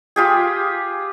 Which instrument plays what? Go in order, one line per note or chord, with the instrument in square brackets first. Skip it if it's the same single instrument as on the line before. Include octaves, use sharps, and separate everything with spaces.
[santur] F4 G4 G#4